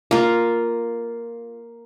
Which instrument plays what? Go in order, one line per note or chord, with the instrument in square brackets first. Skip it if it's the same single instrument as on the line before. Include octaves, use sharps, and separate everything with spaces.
[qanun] A#3 F4